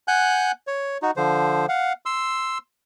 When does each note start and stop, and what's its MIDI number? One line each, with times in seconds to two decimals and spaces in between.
0.08 0.52 78
0.08 0.52 80
0.08 0.52 90
0.08 0.52 91
0.67 0.98 73
1.02 1.11 63
1.02 1.11 66
1.17 1.66 50
1.17 1.66 53
1.17 1.66 72
1.69 1.93 77
1.69 1.93 78
2.06 2.58 84
2.06 2.58 88